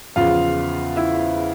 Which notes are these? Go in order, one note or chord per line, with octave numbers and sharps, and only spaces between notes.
E2 C#3 F3 F4 F5
E4 E5